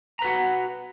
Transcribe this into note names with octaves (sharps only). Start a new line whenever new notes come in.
F#4 B4 F#5 A#5